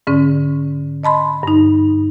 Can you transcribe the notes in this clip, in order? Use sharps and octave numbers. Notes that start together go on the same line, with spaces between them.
G#2 D3 C#4
D#5 A5 B5 C6
G2 D#4